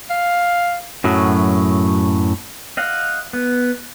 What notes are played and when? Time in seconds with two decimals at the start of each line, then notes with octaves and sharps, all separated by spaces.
0.10 F5
1.04 F#2 A2 F#3
2.77 D#5 F5 F#5
3.33 B3